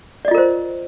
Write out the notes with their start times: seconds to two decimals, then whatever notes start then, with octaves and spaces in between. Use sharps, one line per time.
0.25 D5
0.28 D#5
0.31 F4
0.35 A#4
0.38 C5